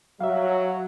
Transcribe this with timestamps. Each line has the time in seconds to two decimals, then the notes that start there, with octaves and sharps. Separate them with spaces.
0.20 F#3 E5 F5